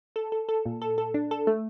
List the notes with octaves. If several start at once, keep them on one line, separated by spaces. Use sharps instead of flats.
A4
A4
A4
A#2
A4
A4
D4
A4
A3